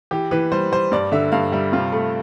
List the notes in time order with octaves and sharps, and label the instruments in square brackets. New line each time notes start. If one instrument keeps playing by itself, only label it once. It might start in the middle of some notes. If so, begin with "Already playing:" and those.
[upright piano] E3 G4
E3 B4
G3 C5
G3 C5
G2 D5
D3 E5
G2 F5
G3 E5
C3 F4
A3